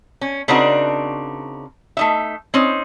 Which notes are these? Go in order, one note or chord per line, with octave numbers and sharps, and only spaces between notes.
C#4
C#3 C4 D4 D#4 F#4 A#4
A3 D#4 E5
C4 C#4 D#4